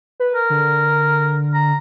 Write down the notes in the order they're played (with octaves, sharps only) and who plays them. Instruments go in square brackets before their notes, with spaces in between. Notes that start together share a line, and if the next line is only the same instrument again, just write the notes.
[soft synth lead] B4
[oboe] A#4
[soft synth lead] D3
[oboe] A#5